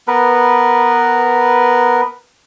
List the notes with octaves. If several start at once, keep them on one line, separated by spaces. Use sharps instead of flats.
B3 A#4 B4